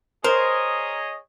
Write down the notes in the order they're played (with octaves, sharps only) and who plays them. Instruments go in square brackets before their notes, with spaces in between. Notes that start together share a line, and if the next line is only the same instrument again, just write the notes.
[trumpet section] G#4 C#5 D#5 [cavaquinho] A#4 [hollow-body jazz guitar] C5